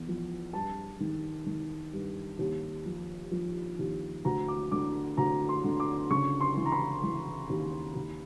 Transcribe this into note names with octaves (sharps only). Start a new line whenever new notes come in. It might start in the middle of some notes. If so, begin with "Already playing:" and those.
Already playing: E2
F3
G2 A5
D#3
D#3
G2
D#2
F3
F3
D#2
D2 A#5
D6
D3 D6
D2 A#5
C6
D3
D6
C#3 C#6
C6
E3
A#5
B5
E3
D#2
D#2